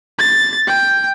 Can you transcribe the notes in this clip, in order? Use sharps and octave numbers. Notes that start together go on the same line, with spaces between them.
A6
G5